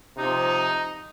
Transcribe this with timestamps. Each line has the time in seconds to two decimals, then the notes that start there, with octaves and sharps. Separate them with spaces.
0.17 C3 F3 D#4